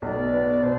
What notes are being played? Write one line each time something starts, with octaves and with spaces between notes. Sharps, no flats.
B1 D5
B3
B2 C5